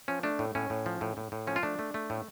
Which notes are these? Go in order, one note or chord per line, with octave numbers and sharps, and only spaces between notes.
F3 C#4
A3 D4
A2
A2 C#4
A2
F3
A2
A2
A2
F3 C#4
F4
A3 D4
A3
A3
A2